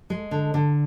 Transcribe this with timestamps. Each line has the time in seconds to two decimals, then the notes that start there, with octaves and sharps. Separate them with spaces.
0.10 G#3
0.31 D3
0.54 D3